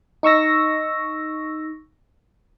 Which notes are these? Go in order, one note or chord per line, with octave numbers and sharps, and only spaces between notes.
D#4 C#6 E6 A#6